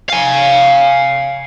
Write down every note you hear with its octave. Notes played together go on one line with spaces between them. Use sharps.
F5 G#5